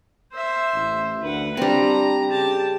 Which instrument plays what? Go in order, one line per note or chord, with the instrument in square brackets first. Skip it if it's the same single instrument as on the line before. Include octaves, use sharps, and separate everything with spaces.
[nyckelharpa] C5 E5
[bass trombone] A1
[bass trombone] D2 [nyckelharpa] B4 F#5
[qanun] G3 C4 [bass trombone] D4 [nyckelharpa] A#5
[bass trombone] C#3 [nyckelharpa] G4 A5